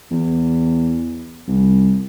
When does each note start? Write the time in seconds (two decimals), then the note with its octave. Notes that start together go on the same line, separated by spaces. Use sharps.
0.11 E2
1.47 C2